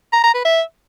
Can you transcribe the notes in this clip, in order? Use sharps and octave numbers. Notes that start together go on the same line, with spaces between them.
A#5
A#5
B4
E5